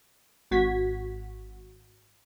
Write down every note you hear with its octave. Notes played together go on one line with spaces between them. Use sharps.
G#1 F#4 G#6 B6